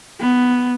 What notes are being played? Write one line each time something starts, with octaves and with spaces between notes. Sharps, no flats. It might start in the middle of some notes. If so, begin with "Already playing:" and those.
B3